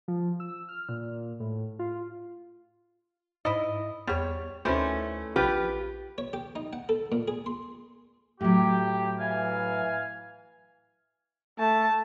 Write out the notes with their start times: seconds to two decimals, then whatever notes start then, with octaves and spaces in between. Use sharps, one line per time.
0.08 F3
0.40 E6
0.69 F6
0.89 A#2
1.40 A2
1.79 F4
3.45 G#2 E4 D#5
4.07 E2 G3 C#5
4.65 D2 D#3 E3 A3 C#4 C5
5.36 A#1 F4 G4 B4
6.18 C#5
6.33 G4
6.56 D#4
6.73 F#5
6.89 A4
7.12 A#2
7.28 G#4
7.46 C6
8.41 A2 F#3 G4
9.19 E3 F5 G#5
11.59 A3 A5